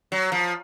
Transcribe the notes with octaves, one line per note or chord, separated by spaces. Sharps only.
F#3
F3